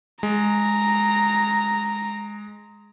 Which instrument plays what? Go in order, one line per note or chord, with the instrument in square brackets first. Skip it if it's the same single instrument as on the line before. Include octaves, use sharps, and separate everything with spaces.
[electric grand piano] G#3 [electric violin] A#5